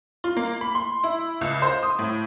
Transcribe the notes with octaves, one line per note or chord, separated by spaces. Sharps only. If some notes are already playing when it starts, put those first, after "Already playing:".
F4
A#3
B5
C6
E4
C#2
C5
D#6
A2